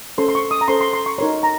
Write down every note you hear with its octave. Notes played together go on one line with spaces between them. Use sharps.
C#4 A4 C5 C6
C6
C#6
D#6
A#5
C#4 A4 C5 C6
C6
C6
C#6
D#4 A#4 C#5 C6
A#5